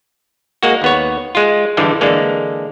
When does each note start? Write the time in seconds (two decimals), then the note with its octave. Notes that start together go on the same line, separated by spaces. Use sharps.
0.63 G#3 A#3 F#4
0.82 D#2 B3 C#5
1.35 G#3 F4
1.77 G2 D3 E3 G3 G#3
2.01 D3 E3 G#3 A#3